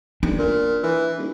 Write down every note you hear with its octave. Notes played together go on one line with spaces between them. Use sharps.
D#1 D4
A#2
E3
D#1